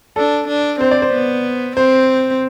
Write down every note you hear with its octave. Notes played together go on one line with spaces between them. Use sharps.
D4 A4
D4
C4 C5
D5
C5
B3
C4 C5